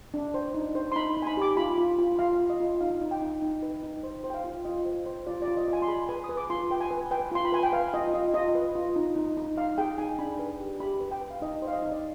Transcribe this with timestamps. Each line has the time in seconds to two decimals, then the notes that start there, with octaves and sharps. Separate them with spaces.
0.14 D4
0.34 C5
0.54 D#4
0.75 C5
0.92 C6
0.96 D#4 B5
1.17 D#4
1.22 G#5
1.27 B5
1.37 G4 D6
1.57 F4 B5
1.78 F4
1.98 F4
2.19 F4 F5
2.40 F4
2.50 D#5
2.60 F4
2.81 D#4 F5
3.01 D#4
3.11 G5
3.21 D#4
3.42 D#4
3.62 B4
3.83 D#4
4.03 C5
4.24 C5
4.30 G5
4.34 F5
4.44 F4
4.65 F4 D#5
4.86 C5
5.06 C5
5.27 F4 D5
5.42 D5
5.47 F4
5.57 D#5
5.68 F4 G#5
5.82 C6
5.88 G#4 B5
6.09 B4 G#5
6.24 D#6
6.29 B4
6.37 D6
6.50 F4 C6
6.70 B4 G5
6.81 G#5
6.91 B4
7.11 B4 G5
7.32 F4 C6
7.45 B5
7.52 B4 G#5
7.63 G5
7.73 B4 F5
7.94 F4 D#5
8.14 F4 D#5
8.34 F4 D#5
8.55 B4
8.75 F4
8.96 D#4
9.16 D#4
9.37 D#4
9.57 D#4 F5
9.78 G#4 G5
9.98 D#4 G#5
10.19 D4 B5
10.39 B4
10.60 G4
10.80 G4 B5
11.00 B4
11.11 G5
11.21 B4
11.31 F5
11.42 D#4 D#5
11.62 C5
11.68 F5
11.73 D#5
11.82 D#4
11.92 D5